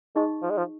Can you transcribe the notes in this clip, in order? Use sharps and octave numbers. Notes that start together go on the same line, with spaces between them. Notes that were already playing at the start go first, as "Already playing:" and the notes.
G#3 D#4 G#4 D#5 C#6
F3
G#3
F3